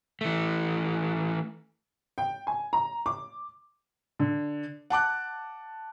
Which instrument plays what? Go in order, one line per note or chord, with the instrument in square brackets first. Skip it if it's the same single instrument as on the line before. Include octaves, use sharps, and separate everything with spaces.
[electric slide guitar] E3 A3
[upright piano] G5
G#5
A#5
D6
[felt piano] D3
F#5 A5 D6 F#6